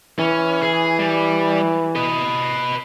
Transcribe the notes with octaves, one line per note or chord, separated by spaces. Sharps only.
E3 C#4
G#4
G3
B4 D#5